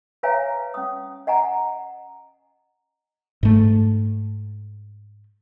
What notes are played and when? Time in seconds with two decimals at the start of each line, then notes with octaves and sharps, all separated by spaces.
0.23 B4 C#5 E5 F5 G#5 A#5
0.74 C#4 D#6
1.27 D#5 F#5 G#5 A#5
3.43 G#2 A3